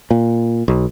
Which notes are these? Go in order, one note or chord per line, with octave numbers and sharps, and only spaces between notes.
A#2
B1